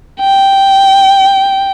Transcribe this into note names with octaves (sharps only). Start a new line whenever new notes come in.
G5